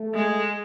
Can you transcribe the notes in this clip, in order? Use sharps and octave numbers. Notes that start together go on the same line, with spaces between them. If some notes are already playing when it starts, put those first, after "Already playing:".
Already playing: A3
G#3